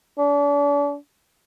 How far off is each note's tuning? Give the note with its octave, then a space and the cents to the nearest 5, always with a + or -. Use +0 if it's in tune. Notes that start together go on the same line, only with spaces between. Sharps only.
D4 -40